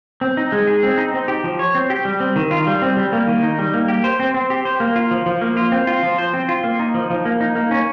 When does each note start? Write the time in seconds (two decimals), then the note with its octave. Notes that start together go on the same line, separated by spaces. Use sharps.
0.21 C4
0.37 D#4
0.52 G#3
0.67 G#4
0.83 C4
0.98 D#4
1.14 C4
1.28 G4
1.44 F3
1.59 C#5
1.75 C4
1.90 G4
2.05 G3
2.20 C4
2.36 D#3
2.51 F4
2.67 G3
2.82 C4
2.97 G3
3.13 A#3
3.27 D#3
3.43 D#4
3.59 G3
3.74 A#3
3.88 G4
4.04 C5
4.20 C4
4.34 C4
4.50 G4
4.65 C5
4.80 A#3
4.96 F4
5.11 F3
5.26 F3
5.42 A#3
5.57 F4
5.72 C4
5.87 F4
6.03 F3
6.18 C5
6.33 C4
6.49 F4
6.64 A#3
6.79 D#4
6.94 F3
7.10 F3
7.25 A#3
7.41 D#4
7.55 A#3
7.71 C#4